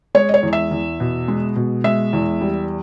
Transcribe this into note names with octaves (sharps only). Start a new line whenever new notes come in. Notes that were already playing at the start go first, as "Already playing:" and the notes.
G#3 C#5
D#5
C#5
E2
E5
E2
B2
G#3
B2
G#3 E5
E2
G3